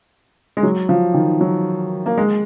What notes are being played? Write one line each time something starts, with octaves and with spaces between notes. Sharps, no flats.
G#3
F#3
F3
D#3
F#3
A#3
G#3